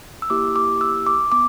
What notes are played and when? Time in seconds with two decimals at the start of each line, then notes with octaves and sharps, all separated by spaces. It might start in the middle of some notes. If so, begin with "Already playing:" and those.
0.22 E6
0.30 A#3 E4 G4 D6
0.56 D6
0.81 E6
1.07 D6
1.32 B3 D6